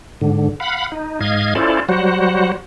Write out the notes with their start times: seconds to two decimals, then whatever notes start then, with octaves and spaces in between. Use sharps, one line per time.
0.21 G#2 D3
0.60 F5 F#5 B5
0.92 D#4
1.21 G#2 D#5 F5 G#6
1.55 C#4 E4 F4 A4 C5 D5
1.89 F#3 G3 F#4 C5 F#5